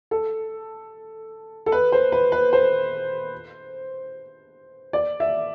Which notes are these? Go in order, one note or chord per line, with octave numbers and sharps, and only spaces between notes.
A4
A4
B4
C5
B4
B4
C5
D5
E5